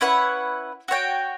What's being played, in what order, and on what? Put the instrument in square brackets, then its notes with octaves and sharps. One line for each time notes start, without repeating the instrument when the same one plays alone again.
[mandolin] C#4 E4 B4 F#5
F#4 C#5 G5